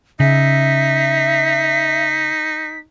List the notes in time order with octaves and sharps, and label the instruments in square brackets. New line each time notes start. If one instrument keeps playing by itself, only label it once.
[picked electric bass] C#3 [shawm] D#4 [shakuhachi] E5 [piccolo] B6